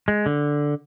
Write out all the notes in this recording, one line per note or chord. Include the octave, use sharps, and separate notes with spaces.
G#3
D3